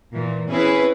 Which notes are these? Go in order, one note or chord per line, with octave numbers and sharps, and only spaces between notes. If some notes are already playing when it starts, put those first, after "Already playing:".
A#2 E3
C4 C#4 E4 G#4 B4